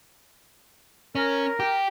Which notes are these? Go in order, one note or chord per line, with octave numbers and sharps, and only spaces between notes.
C#4 A#4
G4